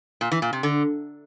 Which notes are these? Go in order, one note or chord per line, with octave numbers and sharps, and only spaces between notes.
A#2
E3
A#2
C3
D3